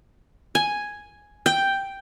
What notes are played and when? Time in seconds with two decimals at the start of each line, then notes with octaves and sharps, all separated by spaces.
0.55 G#5
1.46 G5